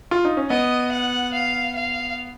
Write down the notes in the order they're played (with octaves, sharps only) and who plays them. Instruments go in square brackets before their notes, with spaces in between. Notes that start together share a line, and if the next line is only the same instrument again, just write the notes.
[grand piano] F4
D#4
C#4
[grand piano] B3 [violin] D#5
[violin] F#5
F5
F5